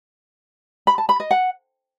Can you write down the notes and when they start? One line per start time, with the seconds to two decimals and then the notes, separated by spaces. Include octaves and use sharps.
0.87 B5
0.98 A5
1.09 B5
1.20 D#5
1.31 F#5